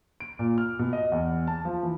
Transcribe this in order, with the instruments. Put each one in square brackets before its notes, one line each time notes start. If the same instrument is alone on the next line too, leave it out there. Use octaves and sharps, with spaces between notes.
[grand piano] D7
A#2
F6
B2
D#5
E2
A5
F3
E3